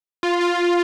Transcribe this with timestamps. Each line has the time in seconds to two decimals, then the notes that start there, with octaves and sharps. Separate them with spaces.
0.23 F4
0.41 F4